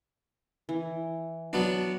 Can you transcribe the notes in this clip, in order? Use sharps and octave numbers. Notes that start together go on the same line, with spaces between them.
E3
F#3 B3 D4